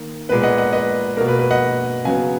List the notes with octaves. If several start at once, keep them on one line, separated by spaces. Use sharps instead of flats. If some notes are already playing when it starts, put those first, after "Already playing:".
Already playing: D#3 A#3
A#2 G#3 B3 B4
D#5 F#5
D#5 F#5
B4 D#5
B2 A#3 A#4
B4
B4
D#5 F#5
C#3 F#3 B3 F5 G#5